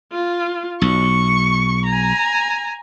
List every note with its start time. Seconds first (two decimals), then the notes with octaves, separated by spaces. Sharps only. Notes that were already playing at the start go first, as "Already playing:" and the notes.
0.12 F4
0.82 B1 C#6
1.86 G#5 A#5